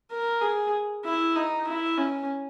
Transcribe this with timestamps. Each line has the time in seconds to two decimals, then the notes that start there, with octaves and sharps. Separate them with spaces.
0.11 A#4
0.42 G#4
1.05 E4
1.36 D#4
1.68 E4
1.98 C#4